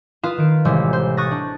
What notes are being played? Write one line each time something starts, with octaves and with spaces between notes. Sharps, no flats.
F4 B4 F5 D#6 E7
D#3 D7
A1 C3 G3 G#3 C5 E6
C5
C#6 D#6 F#6 A6 A#6
D4